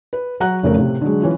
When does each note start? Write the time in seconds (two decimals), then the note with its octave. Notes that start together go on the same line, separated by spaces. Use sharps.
0.13 B4
0.40 F#3 F#5 A#5 F#6
0.63 F1 C#3 A3 A#4
0.75 A2 C3
1.01 D3 F#3 G#3
1.22 E3 C#4 F4